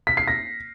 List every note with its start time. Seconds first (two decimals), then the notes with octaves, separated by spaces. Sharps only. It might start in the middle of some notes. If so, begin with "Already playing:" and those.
0.07 B6
0.17 C7
0.28 A#6